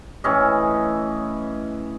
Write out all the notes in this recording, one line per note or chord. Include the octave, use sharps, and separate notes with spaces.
A2 E3 C#4 D#5